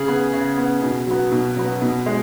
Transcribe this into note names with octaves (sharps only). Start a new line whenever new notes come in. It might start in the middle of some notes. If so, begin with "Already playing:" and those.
Already playing: C#3 G#4
B3
C#3
B3
B2
F#3 B3
B2
F#3 B3
B2
G#3